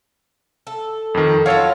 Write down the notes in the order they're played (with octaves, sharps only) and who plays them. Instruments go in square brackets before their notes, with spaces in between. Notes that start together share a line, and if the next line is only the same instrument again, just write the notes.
[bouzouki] A4
[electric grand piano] F2 D#3
[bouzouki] F#3 C#4 F4 [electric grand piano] A4 C#5 F5